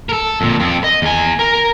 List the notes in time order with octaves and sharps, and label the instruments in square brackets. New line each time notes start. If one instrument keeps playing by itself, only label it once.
[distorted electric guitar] A4 A#4
F2 A#2
F2 C4
D#5
E2 G#5
A#4